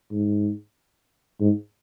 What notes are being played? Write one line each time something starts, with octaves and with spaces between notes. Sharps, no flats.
G#2
G#2